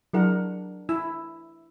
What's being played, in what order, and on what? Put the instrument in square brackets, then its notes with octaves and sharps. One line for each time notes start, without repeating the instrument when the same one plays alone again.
[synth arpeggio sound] F#3 E4 G#4 [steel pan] D4 A#4 F#5
[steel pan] E4 [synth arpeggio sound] E6